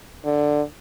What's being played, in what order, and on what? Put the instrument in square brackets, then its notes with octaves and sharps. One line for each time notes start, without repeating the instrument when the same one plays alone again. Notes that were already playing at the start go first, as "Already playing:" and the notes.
[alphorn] D3